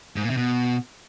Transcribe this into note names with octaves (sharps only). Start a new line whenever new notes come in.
G#2
A#2
C3
B2